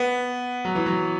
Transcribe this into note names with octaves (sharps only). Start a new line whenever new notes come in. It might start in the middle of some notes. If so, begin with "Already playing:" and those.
Already playing: B3
F#3
E3
F#3